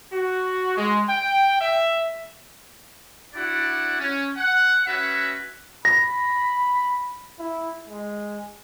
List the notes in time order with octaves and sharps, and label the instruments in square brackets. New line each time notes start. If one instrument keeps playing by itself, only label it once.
[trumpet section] F#4
G#3
G5
E5
D4 E4 F#4 D5 F#5
C#4
F#5
C#4 F#4 B4 E5 F#5
[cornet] B5 [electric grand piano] A#6
[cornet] E4
G#3